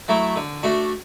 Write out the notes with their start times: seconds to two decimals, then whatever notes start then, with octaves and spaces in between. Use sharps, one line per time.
0.08 F#3 A3 E4
0.36 D3
0.63 A3 D4 F#4